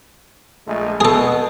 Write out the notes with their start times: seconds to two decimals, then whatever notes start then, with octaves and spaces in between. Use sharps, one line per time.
0.66 A#1 G#3 A3
1.01 B2 G#4 A4